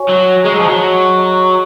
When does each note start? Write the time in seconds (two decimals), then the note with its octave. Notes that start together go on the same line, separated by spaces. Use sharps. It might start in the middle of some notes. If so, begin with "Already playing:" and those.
Already playing: F#4 C#5 G#5 C#6
0.09 F#3
0.44 G#3 G#4 D#5 A#5 C#6
0.53 F#3
0.60 F3
0.69 F#3
1.18 G#4 D#5 A#5 C#6